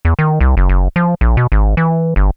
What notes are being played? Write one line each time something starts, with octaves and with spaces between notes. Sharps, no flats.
E2
D#3
C2
F#1
F#1
F3
A#1
B2
G#1
E3
G1